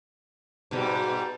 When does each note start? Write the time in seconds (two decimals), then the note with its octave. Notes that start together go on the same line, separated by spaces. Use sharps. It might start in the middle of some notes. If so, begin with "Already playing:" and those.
0.71 G#2 B2 G3